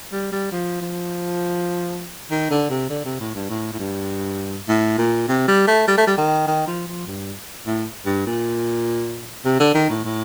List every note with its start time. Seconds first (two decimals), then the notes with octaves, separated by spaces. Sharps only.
0.13 G3
0.32 G3
0.52 F3
0.81 F3
2.31 D#3
2.50 D3
2.70 C3
2.90 D3
3.05 C3
3.20 A2
3.34 G2
3.49 A2
3.73 A2
3.79 G2
4.68 A2
4.98 A#2
5.28 C3
5.48 G3
5.67 A3
5.88 G3
5.98 A3
6.07 G3
6.18 D#3
6.47 D#3
6.67 F3
6.87 F3
7.06 G2
7.66 A2
8.06 G2
8.26 A#2
9.45 C3
9.60 D3
9.74 D#3
9.90 A2
10.04 A2